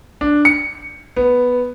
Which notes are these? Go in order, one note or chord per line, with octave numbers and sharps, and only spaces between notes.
D4
C#7
B3